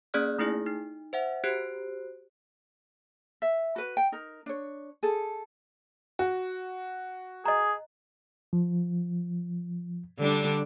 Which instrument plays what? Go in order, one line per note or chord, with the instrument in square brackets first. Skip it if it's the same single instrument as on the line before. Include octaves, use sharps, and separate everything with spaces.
[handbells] A#3 C#4 G#4 D5 F6 F#6
A3 D#4 E4 G#4
D#4
C5 E5 F#5
F#4 G4 C5 F#6 C7 D7
[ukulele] E5
F#4 B4
G5
D#4 A#4
D4 C#5
G#4 A4
[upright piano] F#4
[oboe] G#4 [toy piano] D#5 A#5
[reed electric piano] F3
[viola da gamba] D3 G3 D4